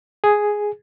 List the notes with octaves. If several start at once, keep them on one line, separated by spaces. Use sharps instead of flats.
G#4